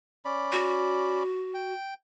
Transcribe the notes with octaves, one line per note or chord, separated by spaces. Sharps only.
C#4 D5 B5
F#4
G5